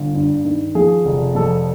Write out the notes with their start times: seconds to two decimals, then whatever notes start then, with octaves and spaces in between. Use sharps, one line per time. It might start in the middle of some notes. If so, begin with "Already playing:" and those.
Already playing: G1
0.15 G2
0.45 D#3
0.75 F3 G#4
1.05 F1
1.35 F2 A4